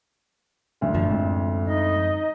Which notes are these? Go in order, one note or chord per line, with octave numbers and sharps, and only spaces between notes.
A1 D2 D3
F#2 A#2 F3
F#2 G#3 C4
D#4 D#5